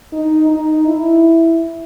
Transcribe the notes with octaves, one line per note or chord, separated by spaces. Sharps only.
D#4
D#4
E4